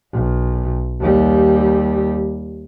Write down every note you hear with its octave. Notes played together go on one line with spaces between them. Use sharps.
B1
D#2 G3